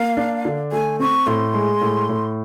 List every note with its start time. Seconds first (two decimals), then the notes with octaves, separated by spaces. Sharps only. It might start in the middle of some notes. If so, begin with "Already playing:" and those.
Already playing: A#3 F5
0.17 D4
0.45 D3
0.72 A3 G#5
1.00 C4 C#6
1.26 A2 C6
1.54 G#3
1.81 A2
2.09 A2